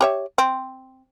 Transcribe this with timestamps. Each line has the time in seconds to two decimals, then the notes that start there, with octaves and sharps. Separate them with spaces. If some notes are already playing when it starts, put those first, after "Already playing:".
0.01 G4 C#5 E5
0.38 C4